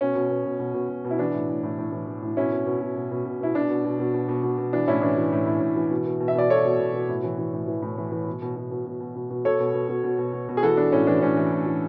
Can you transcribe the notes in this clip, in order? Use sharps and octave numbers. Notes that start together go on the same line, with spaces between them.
B2 C#4
B2
B2
B2
B2
B2
B2
B2
E4
E3 D4
A2
A2
A2
A2
E3
E3
A2
B2 C#4 E4
B2
B2
B2
B2
B2
B2
B2 E4
B2 D4
B2
B2
B2
B2
B2
B2
B2
E3 D4
A2 C#4 E4
E3 D4
E3
A2
A2
A2
E3
B2
B2
B2
E5
B2 D5
B2 A4 C#5
B2
B2
B2
A2
E3
E3
A2
E3
A2
E3
E3
B2
B2
B2
B2
B2
B2
B2
B2
B2 A4 C#5
B2
B2
B2
B2
B2
B2
B2
G#4
E3 F#4 A4
E3 D4
A2 C#4
E3 D4
A2 C#4
E3
A2
E3